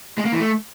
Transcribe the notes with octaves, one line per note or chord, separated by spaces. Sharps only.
G#3
A#3
E3
A3